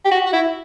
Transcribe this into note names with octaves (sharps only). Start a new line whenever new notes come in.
G4
F#4
F#4
E4